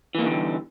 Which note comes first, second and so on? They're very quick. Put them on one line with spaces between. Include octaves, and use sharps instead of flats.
E3 A#3 E2 D3 G3